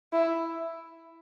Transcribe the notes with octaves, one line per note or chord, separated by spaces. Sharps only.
E4